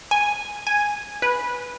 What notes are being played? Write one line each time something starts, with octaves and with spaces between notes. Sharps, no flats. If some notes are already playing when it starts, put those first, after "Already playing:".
G#5
G#5
B4